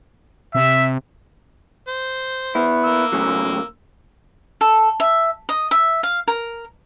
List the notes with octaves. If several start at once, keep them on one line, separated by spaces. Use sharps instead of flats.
C3 E5
C5
B3 E4
A#3 E6
A2 C#3 F#3
A4
E5
D#5
E5
F5
A#4